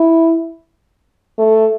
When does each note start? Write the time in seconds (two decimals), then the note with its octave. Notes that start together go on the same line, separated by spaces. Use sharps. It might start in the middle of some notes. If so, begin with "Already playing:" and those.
Already playing: E4
1.38 A3